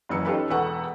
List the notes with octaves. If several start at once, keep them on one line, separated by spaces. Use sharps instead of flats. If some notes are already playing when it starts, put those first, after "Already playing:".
F#1 F#2 E3 E6 C#7
C#4 D#4 F4 G4 A4 B4
E1 E2 A4 B4 F#5 C#6